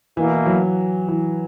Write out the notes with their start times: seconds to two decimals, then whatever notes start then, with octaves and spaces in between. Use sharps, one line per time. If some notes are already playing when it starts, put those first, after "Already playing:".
0.17 B2 E3 A#3 E4
0.46 F#3
1.08 E3